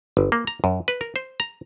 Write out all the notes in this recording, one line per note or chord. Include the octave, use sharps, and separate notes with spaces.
G1
A#3
A#5
F#2
B4
A#4
C5
A#5